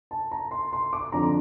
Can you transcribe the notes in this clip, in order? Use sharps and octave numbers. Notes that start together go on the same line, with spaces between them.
A5
A#5
C6
C6
D6
F2 D3 F3 A#5